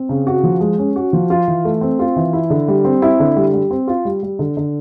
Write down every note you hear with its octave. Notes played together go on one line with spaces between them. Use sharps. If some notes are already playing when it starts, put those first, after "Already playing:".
Already playing: C4
C#3
F#4
F3
G#3
C#4
F#4
F3
F4
E3
A3
C4
F4
E3
E4
D3
G3
C4
E4
D3
G3
G3
C4
F4
G3
G3
D3
D3